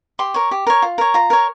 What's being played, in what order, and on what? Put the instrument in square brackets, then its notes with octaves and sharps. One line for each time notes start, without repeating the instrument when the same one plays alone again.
[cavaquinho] G4 C6
A#4 C#5
G4
A#4 C#5
F4
A#4 C#5
F4 A#5
A#4 C#5